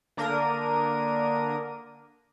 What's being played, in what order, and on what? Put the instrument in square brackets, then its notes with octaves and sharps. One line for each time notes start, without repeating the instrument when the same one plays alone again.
[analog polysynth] D3 A#3 D4 A#4 D#6 D#7